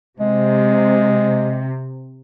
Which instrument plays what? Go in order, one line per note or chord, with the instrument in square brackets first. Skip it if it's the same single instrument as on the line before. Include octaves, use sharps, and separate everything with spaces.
[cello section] C3 [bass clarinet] G#3